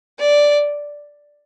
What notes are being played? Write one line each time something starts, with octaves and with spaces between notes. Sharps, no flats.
D5